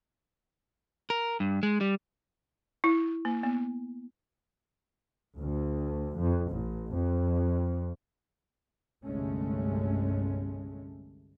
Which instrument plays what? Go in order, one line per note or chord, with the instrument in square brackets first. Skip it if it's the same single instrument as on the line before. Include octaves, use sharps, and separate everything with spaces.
[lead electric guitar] A#4
G2
G#3
G3
[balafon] E4
A#3
B3
[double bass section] D2
F2
A1
F2
G1 C2 G#3 A3 C#4